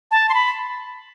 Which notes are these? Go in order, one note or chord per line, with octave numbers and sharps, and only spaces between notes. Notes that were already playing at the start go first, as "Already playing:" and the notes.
A5
C6
B5